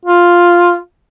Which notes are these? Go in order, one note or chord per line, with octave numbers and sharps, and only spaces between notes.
F4